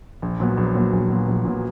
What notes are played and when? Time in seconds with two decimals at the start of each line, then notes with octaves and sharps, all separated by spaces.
0.22 A#1
0.40 A#2 F#3 B3
0.57 A#1
0.75 A#2 F#3 B3
0.93 A#1
1.10 A#2 F#3 B3
1.28 A#1
1.45 A#2 F#3 B3